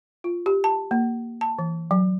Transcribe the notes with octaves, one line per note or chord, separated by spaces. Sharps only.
F4
G4
A5
A#3
A5
E3
F#3